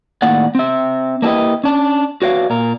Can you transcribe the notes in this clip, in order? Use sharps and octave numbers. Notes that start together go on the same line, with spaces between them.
A2 D#3 A#3 D5 F#5
C4 E5
A#3 D4 E4 G4 B4 D#5
C#4 D4
F#4 B4 C#5 D5 E5 F5
A#2 A#4